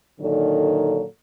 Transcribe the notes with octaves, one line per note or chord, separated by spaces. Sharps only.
A#2 D3 D#3 F#3 A4